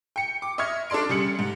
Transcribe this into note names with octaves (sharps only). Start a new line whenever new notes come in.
G5 C#7
D6
D#5 E5 C#6 F6 G#6
D4 A4 D5 C6 D7
C#3 G3 C#7 F#7
G#2